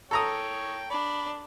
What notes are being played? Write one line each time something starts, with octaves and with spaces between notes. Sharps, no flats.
A4 C#5 G5 A#5 D#6
D4 B5